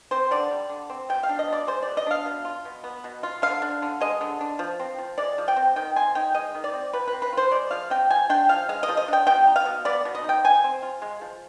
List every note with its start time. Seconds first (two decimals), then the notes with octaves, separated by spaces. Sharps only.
0.11 C4 C5
0.31 D3 D5
0.51 G3
0.70 D3
0.90 C4
1.09 B2 G5
1.23 F5
1.29 D4
1.39 D#5
1.47 B2
1.53 D5
1.67 G#3 C5
1.83 B2 D5
1.97 D#5
2.07 D4 F5
2.26 B2
2.45 F4
2.65 B2
2.84 B3
3.04 B2
3.23 F4
3.42 D3 F5
3.62 D4
3.82 D3
4.01 G#3 D#5
4.21 D3
4.41 D4
4.59 F3
4.79 C4
4.99 F3
5.18 G#3 D5
5.38 F3
5.48 G5
5.56 C4
5.76 D#3 G5
5.96 C4 G#5
6.15 D#4 G5
6.35 G#3 D#5
6.55 D#3
6.64 D5
6.73 C4
6.93 F3 B4
7.08 B4
7.13 C4
7.22 B4
7.33 F4 C5
7.51 G#3 D5
7.71 F3 F5
7.90 C4 G5
8.10 F3 G#5
8.29 D4 G5
8.49 F3 F5
8.69 G#3 F5
8.83 D#5
8.89 F3
8.97 D#5
9.08 D4 G5
9.27 B2 G5
9.47 D#4
9.56 F5
9.65 B2
9.85 B3 D5
10.05 B2
10.15 D#5
10.24 D#4
10.29 G5
10.44 F3 G#5
10.64 C4
10.82 F4
11.02 G#3
11.21 F3